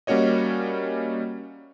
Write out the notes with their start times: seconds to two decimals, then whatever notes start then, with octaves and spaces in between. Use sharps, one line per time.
0.07 G3 A#3 C#4 F#4 C#5 D#5